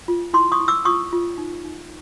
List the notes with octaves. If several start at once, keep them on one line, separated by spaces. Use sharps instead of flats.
F4
E4 C6 D6
C#6 D#6
E4
D6 E6
F4 C#6 D#6
F4
D#4
D#4